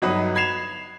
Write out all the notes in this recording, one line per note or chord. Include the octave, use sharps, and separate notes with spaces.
G1 F#3 D#4 B4 D#6
B5 G#6 C7 E7 F7